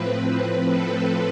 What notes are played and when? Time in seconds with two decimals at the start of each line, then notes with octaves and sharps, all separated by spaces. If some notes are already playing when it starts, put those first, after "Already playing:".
Already playing: A2 F3 C4 B4
0.74 A4